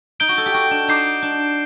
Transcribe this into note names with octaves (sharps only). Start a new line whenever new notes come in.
D#4 G6 D7 G7
F#4
A4
G4
F#4
D4
D#4 D6 G6 C7 G7
D4